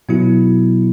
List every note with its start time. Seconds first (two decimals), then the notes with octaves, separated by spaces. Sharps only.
0.09 B2 F#3 B3 E4